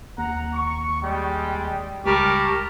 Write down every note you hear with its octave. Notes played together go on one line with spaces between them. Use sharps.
D#2 F#5 A#5
C#6
G3 G#3 G5
C#2 G3 A#4 A5 C#6